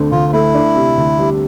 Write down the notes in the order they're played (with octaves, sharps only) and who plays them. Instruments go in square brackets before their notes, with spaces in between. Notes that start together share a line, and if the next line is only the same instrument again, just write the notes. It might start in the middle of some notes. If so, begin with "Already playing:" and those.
Already playing: [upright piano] D2 D3 C4
[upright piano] D2 [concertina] F4
[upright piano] A3 [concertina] E4
[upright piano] D4
C3
D2
G3